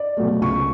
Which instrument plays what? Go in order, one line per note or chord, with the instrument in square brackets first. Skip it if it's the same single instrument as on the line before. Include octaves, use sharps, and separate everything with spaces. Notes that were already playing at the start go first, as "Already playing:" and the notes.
Already playing: [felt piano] D5
B2 F#3 A3
C#2 C#6